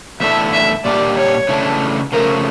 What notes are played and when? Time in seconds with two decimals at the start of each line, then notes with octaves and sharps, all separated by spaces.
0.20 E2 D3 A3 E4 A4 E5
0.53 E5
0.85 A#2 G3 A#3 D4 G4 D5
1.17 C#5
1.49 C#3 E3 A3 D4
2.12 C#3 F3 A3 A#4